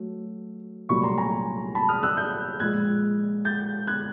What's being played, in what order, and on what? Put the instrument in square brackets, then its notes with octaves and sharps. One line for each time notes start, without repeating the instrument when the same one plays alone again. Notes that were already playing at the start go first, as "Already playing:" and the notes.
Already playing: [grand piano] F#3 A3
C2 A#2 F#3 A3 B5 C#6
A#5 C6
G#5 A#5
A5 B5
D#6 F6
E6 F#6
F6 G6
A#2 F3 G#3 F#6 G#6
G6 A6
F#6 G#6